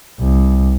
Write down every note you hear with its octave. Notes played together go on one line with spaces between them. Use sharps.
C2